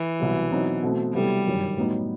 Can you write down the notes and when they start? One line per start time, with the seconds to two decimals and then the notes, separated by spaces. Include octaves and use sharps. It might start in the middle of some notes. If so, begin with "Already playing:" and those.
Already playing: E3
0.20 C2 B2 F#3
0.51 B2 F#3 C4 D#4
0.83 B2 A3 C4
1.14 C3 F#3 G3 B3 E4 A4
1.46 G1 F#2 D#3
1.77 A2 F#3 B3 D#4